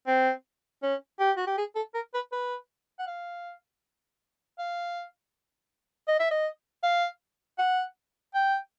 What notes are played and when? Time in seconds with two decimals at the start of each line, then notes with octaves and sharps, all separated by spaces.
0.07 C4
0.83 C#4
1.20 G4
1.37 F#4
1.47 G4
1.58 G#4
1.76 A4
1.94 A#4
2.14 B4
2.32 B4
2.99 F#5
3.07 F5
4.59 F5
6.08 D#5
6.20 E5
6.31 D#5
6.83 F5
7.58 F#5
8.34 G5